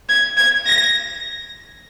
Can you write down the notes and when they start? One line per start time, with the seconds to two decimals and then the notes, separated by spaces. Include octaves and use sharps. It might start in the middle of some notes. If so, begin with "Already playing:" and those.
0.09 G#6
0.37 G#6
0.66 A#6